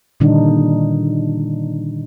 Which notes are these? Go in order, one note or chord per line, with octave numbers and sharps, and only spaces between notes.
A#2 D3 D#3 G3 D4 D#4